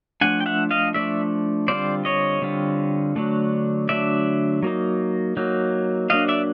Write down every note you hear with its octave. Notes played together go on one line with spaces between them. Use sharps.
F3 A3 D4 F#5 G#5
G5
E5 F#5
D#5 F5
F3 A3 D4 D5 E5
D3 G3 C4 F4 C5 D5
C#5 D#5
D3 G3 C4 F4
D3 F#3 A3 D4
D3 F#3 A3 D4 D5 E5
F#3 A#3 D#4
F#3 A#3 D#4
F#3 A#3 D4 D#5 F5
D5 E5